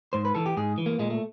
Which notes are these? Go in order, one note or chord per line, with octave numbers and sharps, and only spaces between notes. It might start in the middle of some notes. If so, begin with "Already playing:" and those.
G#2 C5
B4
E3 A4
G4
G#2 G#4
E3
A#3
A#2 G#3
A3